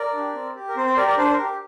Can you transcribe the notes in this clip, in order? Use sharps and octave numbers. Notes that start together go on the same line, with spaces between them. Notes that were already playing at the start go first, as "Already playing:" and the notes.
Already playing: A#4 D5
D4 G4
C4
G4
A#4
C4 C5
C5
G4 A#4 D5
A#4 D5
D4 C5
C5
A#4
G4